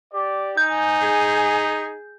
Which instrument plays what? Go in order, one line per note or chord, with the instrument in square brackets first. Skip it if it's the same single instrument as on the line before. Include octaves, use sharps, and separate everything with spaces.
[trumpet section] G4 D5
[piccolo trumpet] D#4 [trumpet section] G#5 [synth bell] G6
[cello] G#4